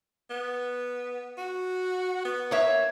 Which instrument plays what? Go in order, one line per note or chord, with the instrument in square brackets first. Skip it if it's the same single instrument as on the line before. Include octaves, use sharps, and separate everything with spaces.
[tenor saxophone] B3
F#4
B3
[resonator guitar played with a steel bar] A#3 C#5 E5